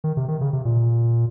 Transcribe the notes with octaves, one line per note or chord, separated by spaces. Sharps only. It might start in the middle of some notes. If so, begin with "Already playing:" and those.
D#3
C3
D#3
C#3
C3
A#2